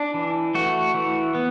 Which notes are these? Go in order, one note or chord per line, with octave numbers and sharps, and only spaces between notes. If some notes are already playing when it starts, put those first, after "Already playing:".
Already playing: D4
E3
A3 F#4
E3
B3